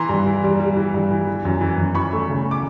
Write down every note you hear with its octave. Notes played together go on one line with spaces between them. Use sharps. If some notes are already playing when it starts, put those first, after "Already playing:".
Already playing: E3 A#5 C6
G2
E3
G3
G3
E3
G2
E3
E3
F#2
E3
F#2
E3 B5 C#6
A3
C#3
D6